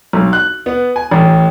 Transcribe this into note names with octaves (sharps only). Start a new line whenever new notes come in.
B1
F#6
B3
G#5
A1